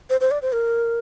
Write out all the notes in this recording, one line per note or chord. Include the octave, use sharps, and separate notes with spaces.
C5
C5
D5
C5
A#4